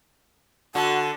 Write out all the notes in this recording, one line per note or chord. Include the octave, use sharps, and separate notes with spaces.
D3 F#4 A5